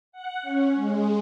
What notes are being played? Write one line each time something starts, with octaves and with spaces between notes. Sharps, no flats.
F#5
C#4
G#3